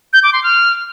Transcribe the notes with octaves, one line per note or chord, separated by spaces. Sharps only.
G6
D6
C6
F6